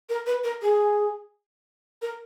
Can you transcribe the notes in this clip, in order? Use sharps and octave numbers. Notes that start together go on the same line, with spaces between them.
A#4
B4
A#4
G#4
A#4